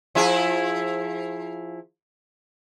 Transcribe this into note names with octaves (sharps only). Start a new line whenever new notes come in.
F3 E4 G#4